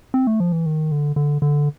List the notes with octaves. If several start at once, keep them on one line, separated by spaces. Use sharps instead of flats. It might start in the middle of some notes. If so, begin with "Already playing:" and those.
C4
A3
F3
E3
D#3
D3
D3
D3